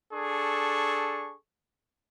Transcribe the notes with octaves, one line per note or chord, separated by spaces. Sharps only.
D4 G#4 A4 C#6